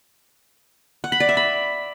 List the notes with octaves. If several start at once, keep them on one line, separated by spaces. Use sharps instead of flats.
F#5
B5
D5
E5
B5